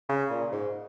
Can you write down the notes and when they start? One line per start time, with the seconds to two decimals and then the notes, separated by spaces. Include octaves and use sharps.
0.09 C#3
0.30 A#2
0.52 G#2